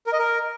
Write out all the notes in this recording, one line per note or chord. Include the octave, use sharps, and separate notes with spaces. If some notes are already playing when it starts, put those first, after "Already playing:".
A#4
D#5
A#4